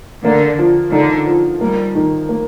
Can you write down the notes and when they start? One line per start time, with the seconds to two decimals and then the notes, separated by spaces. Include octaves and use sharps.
0.24 D3 A#3
0.59 F3
0.92 D3 D#4
1.27 F3
1.61 G3 A#3
1.95 D#3
2.29 A#3